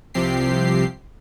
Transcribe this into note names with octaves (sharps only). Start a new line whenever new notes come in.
C2 C3 F3 C4 G4 C7